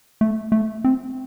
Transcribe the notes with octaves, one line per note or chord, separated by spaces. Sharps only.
A3
A3
C4